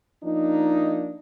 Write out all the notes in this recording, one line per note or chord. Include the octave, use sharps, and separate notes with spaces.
F3 A#3 D4 D#4